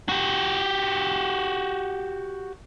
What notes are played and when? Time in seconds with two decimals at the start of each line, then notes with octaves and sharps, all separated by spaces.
0.09 F#4 G4